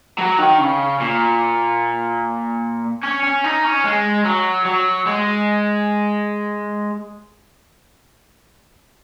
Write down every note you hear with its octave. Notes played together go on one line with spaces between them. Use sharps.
F#3
D#3
C#3
A#2
C#4
C#4
D#4
C#4
G#3
F#3
F#3
G#3